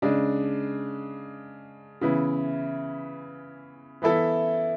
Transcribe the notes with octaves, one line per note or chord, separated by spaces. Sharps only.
C#3 G#3 D4
C#3 E3 B3 E4
E3 B3 E4 A4 E5